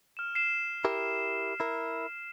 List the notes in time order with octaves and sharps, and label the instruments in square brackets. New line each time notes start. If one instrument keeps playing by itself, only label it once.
[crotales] F6 E7
C7 E7
[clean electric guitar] E4 G4 A#4
E4 A#4